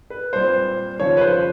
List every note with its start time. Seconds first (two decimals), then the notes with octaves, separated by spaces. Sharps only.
0.10 B4
0.33 A#2 G3 C4 C5
1.00 D#2 C#3 F3 C#5
1.17 B4
1.21 C5